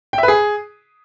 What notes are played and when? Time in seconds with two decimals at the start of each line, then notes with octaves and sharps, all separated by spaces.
0.13 G5
0.18 E5
0.23 B4
0.28 G#4